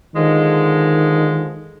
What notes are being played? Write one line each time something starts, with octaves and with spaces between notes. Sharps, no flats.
D3 D#3 F3 G#3